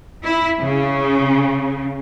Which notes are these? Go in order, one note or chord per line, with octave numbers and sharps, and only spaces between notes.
E4
C#3